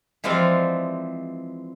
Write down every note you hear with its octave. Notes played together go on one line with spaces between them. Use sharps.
E3 F3 G#3 C4 D5 F5